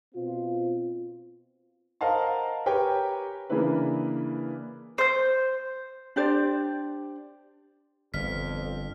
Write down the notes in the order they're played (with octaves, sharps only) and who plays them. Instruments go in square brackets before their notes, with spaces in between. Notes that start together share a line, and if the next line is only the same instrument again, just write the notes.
[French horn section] B2 C4 F4
[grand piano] A#4 C5 D#5 F5 F#5 A5
G4 A#4 B4 C#5 G5 G#5
C#3 E3 A#3 D4 E4 B4
[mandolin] C5 G6
[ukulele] D4 G4 C5 D5
[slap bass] G1 [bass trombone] F2 [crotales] F6 B6